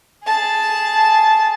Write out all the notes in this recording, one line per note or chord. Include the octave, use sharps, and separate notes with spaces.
G#4 A5